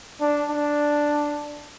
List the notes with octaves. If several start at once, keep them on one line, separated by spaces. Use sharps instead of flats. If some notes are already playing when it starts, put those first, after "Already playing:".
D4
D4